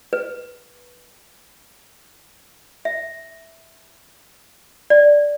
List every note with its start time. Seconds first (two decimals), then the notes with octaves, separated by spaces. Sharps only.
0.13 B4
2.85 E5
4.90 D5